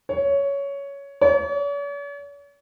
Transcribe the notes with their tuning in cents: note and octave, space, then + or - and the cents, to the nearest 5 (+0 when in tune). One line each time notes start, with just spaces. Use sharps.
C#5 +10
C#5 +45